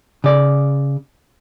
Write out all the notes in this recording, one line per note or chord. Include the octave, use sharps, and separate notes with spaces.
C#3 D5